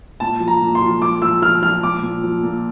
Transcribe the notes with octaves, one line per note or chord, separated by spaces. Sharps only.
A#2 A5
F3
A#5
A#2
C6
F3
F3 D6
F3 E6
F3 F6
F3 F6
A#2 D6
A#2
F3
A#2